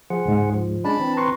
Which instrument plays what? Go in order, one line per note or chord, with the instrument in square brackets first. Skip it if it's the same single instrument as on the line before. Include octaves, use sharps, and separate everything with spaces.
[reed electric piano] F3 [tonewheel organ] G#4 C5 F#5
[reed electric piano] C#2 G#2
[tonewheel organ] F3
[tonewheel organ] G#3 C#4 [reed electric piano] D4 [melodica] A5 B5
[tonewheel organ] E3 C4
[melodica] B4 [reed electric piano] A#5 C6 C#6